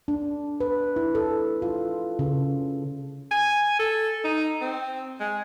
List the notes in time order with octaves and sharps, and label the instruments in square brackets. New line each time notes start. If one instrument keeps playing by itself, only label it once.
[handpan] D4
B4
E4
A4
F4
C#3
[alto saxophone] G#5
A4
D#4
C4
G#3